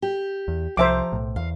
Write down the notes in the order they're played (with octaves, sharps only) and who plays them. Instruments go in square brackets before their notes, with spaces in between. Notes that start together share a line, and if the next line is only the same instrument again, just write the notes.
[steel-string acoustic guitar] G4
[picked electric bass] E2
[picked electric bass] C2 [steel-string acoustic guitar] F3 A5 A#5 [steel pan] C5 E5 D6
[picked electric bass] B1 A2
[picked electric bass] E2 [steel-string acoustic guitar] F5